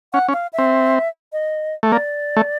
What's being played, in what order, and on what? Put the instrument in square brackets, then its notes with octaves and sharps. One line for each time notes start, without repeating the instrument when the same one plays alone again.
[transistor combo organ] C#4 [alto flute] F#5
[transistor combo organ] C#4
[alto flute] F5
E5
[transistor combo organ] C4
[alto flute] D#5
[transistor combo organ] A3
[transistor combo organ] A#3 [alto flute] D5
[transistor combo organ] A3